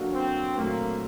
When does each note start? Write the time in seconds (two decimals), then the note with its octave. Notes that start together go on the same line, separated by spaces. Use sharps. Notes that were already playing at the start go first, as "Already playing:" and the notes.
Already playing: F#3 A#3 D4 F#4 A4
0.14 C4
0.57 A#2 F#3 A3 A#3 C4